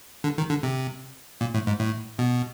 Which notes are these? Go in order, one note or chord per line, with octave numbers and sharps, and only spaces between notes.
D3
D#3
D3
C3
A#2
A2
G#2
A2
B2